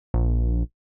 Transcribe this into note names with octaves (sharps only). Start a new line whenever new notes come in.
A#1